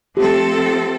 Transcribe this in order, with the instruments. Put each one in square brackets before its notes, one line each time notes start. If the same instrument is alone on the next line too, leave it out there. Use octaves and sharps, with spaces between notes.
[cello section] F3 A3 C4 A4 [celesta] G4